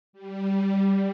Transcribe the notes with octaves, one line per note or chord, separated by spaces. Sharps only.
G3